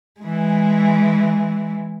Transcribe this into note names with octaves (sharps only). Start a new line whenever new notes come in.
E3 G#3